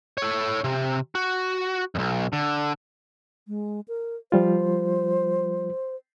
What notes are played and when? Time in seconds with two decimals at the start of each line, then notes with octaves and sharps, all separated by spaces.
0.18 A4 C#5
0.64 C3
1.15 F#4
1.95 B1 F2
2.33 D3
3.48 G#3
3.88 A#4
4.32 F3 G3 F4 C5